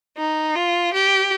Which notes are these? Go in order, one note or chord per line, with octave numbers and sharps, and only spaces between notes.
D#4
F4
G4